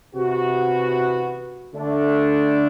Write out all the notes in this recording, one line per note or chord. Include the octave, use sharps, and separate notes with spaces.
C3 E3 B3 F#4
D3 A3 D4